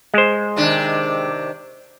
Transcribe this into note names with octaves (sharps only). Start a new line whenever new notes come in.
G#3 C5
C3 D#3 D4